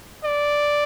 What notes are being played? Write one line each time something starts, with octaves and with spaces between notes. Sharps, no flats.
D5